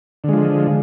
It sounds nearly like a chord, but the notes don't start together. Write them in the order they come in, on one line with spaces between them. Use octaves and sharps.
D3 G#3 F3